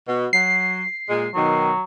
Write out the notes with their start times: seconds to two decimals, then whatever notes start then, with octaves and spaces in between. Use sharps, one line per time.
0.07 B2
0.33 F#3 C7
1.08 A#2 G#3
1.35 B2 D#3 F#3